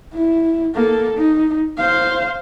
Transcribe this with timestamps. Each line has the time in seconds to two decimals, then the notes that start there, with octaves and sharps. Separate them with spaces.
0.13 E4
0.75 A#3 A4
1.17 D#4
1.78 C5 F5